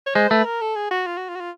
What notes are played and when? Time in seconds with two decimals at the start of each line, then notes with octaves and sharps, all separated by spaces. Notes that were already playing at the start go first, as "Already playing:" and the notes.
0.06 C#5
0.15 G#3 C5
0.30 A3 B4
0.46 A#4
0.61 A4
0.76 G#4
0.91 F#4
1.07 F4
1.17 F#4
1.29 F4
1.36 F#4
1.40 F4